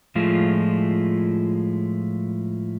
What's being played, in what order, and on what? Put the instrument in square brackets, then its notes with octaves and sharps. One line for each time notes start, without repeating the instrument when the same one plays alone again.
[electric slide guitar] A2 F3 G#3 A3 F4